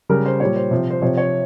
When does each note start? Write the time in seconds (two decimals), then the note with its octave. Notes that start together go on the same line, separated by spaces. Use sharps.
0.09 C#3 G3 A#4
0.26 C5
0.40 A#2 G3 C#5
0.56 C5
0.71 C3 F3
0.90 C5
1.02 C3 F3 C#5
1.17 C#5